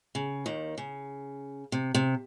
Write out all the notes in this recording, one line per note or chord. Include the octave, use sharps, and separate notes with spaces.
C#3
D#2 D#3
C#3
C3
C3